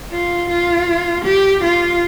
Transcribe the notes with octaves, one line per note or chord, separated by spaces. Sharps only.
F4
F4
G4
F4